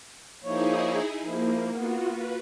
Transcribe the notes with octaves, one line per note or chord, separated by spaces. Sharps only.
F3 A#3 D#4 E4 G#4 C#5
F3 A#3 E4
B3 F4 F#4
B4